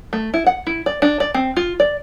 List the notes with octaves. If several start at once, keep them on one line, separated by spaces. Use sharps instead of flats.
A3
E4
F#5
E4
D5
D4
D5
C4
F4
D5